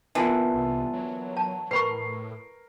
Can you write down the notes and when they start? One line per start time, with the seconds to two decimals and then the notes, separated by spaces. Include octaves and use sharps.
0.15 D3 E3 A#3 B3 F4
0.54 C2
0.93 F#3
1.37 A5
1.71 A2 A#4 B4 B5 C#6 C7